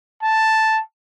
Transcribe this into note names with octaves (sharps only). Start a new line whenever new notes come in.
A5